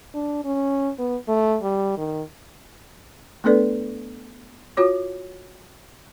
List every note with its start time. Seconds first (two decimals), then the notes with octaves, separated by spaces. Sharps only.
0.14 D4
0.45 C#4
0.98 B3
1.28 A3
1.62 G3
1.97 D#3
3.44 A3 B3 D4 A4 B4 D5
4.77 F4 F#4 C#5 D6